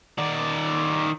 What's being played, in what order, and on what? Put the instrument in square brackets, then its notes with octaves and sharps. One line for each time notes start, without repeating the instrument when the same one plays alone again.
[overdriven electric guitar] D#3 D5